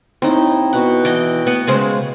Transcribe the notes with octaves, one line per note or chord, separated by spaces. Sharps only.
D#2 C4 D#4 E4
B2 F#5
E3 D5 D#5 G5
B3
C#3 G#3 C5